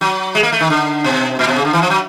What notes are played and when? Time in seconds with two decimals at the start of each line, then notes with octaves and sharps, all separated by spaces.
0.01 F#3
0.35 G#3
0.43 A#3
0.52 A3
0.61 D#3
0.70 D3
1.04 B2
1.39 A#2
1.47 B2
1.56 C#3
1.65 D3
1.73 E3
1.82 F3
1.90 F#3